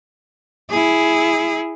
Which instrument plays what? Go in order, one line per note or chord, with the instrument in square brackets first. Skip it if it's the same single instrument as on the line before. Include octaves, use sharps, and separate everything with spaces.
[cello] E4 G#4